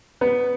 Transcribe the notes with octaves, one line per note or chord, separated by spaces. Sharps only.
B3